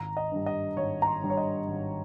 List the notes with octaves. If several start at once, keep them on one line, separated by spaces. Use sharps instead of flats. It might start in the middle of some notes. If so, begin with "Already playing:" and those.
Already playing: G#1 A#5
D#5
G2 G3
D#5
G#1 C#5
A#5
C6
G2 G3
C#5
D#5
G#1